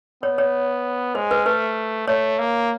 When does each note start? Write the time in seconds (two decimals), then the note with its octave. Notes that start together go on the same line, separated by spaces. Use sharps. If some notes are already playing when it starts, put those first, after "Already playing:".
0.23 B3 C#5
0.38 C#5
1.15 G#3 C5
1.31 B4
1.46 A3 B4
2.08 A3 C#5
2.39 A#3